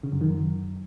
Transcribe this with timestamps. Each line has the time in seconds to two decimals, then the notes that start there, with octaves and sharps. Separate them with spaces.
0.03 C#3
0.12 F#2
0.21 D#3
0.30 F#2